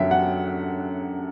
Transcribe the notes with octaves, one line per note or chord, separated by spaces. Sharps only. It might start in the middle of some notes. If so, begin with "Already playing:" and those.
Already playing: F#2 D3 F#3 E5 G5
F#5